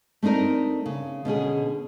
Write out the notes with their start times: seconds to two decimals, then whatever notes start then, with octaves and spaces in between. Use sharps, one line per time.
0.23 A3 C4 D4 D#4 A#4
0.86 C#3
1.25 B2 D3 C#4 G#4